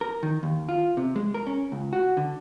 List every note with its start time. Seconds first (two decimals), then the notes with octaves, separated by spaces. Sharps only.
0.01 A#4
0.23 D#3
0.43 D#2
0.69 F4
0.97 C3
1.16 G#3
1.34 A#4
1.47 C#4
1.72 C#2
1.93 F#4
2.17 D3